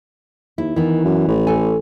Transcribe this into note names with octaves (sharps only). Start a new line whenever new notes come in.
D#2 E4
D#3 E3 B3
F#2
A1
A4 G#5